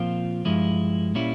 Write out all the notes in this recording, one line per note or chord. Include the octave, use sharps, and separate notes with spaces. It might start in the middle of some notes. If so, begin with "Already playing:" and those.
Already playing: A#2 F3 C4 F4
G2 F3 G#3 E4
A#2 G3 C#4 E4